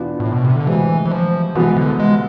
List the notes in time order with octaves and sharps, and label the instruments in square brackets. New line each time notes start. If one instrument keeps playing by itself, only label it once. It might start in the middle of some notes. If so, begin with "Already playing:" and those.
Already playing: [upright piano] E2 B2 B3 D4 F4
[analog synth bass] A2
B2
C3
D3
[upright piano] D2 C3 G#3 [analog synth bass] E3
[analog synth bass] E3
F3
[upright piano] C2 B2 G#3 B3 [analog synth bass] E3
[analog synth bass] D3
G#3